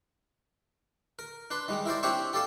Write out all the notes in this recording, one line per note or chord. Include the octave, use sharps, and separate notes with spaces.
A#4
D4 B4 C6
D#3 G3 G#3
E4 A#4 C5 D5
C4 D4 G4 C5 C#5 E5
G4 A4 D5 F5 A5